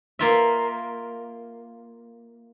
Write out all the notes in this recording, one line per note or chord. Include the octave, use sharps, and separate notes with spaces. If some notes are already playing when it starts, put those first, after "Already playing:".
A#3 F4 E5